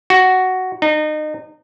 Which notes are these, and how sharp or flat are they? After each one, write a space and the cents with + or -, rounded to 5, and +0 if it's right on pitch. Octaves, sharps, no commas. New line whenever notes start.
F#4 +5
D#4 -30